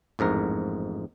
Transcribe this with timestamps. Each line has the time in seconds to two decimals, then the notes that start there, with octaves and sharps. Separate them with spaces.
0.19 A1 F2 G#2 A#4